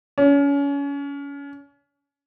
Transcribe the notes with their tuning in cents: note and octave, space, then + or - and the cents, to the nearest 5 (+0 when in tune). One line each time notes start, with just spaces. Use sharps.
C#4 +30